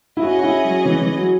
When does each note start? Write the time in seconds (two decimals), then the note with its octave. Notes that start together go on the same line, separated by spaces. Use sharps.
0.17 E4
0.22 C#4 F#4 G#4 D#5
0.39 F#4
0.44 E4
0.65 F#3
0.86 E3
1.02 E3
1.17 F#3